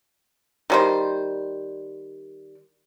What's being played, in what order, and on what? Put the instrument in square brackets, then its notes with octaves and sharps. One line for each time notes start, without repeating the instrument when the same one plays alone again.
[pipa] D#3 G3 C5